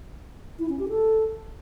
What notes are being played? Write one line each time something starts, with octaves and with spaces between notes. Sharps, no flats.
E4
C#4
G4
A4